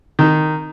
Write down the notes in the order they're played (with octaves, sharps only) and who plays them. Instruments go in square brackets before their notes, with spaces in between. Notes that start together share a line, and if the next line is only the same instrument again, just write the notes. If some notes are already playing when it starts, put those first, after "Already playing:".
[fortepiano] D#3